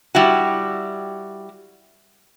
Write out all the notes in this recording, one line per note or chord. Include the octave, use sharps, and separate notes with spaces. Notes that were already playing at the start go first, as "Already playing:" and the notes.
G3 E4 F#4